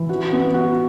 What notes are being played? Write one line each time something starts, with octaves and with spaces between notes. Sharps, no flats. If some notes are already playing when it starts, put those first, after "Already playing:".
Already playing: E3
F#4
B3
F#4